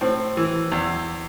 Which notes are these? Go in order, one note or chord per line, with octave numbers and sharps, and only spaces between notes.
A2 C4
E3
E2